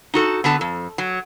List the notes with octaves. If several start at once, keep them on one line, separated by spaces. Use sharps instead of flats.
D#4 F#4 A4
D3 B3 A4 A5
F2
F#3